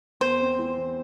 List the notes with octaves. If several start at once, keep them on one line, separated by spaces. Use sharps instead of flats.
E2 C5
C4
E3
E2